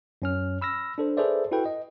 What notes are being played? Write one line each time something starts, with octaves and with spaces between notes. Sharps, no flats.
F#2 C#4 F6
B5 E6 F6 A#6
D4 A4 C5
G#4 A4 B4 C5 D5 E5
E4 F#4 A4 B4 G5
D#5